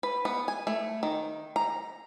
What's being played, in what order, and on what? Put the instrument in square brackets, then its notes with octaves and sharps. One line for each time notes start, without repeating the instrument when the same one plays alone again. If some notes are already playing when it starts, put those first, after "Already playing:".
[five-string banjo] B4
B3
G#5
A3
D#3
A#5